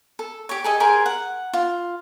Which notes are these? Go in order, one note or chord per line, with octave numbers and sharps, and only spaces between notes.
A4
G4 C#5
G#4 A4 D#5
G4 G#4 A#4 C5
F#5
F4